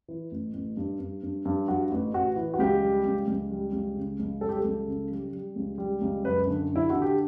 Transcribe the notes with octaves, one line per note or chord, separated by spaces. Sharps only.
E3
A1
A1
G2
G2
G2
G2
G2 F#4
A1
A1 F#4
E3
F#4
C#2 G4
G3
C#2
C#2
G3
C#2
C#3
C#2
G3 A4
G4
A4
C#2
C#3
G3
G3
C#2
G3
C#2
F#2 B4
D3
D3
E4
D3 F#4
G4